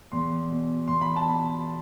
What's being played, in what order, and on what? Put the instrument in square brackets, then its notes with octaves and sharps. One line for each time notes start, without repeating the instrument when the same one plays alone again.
[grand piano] E2 C6
B2
E2 C6
B5
A5
B2 B5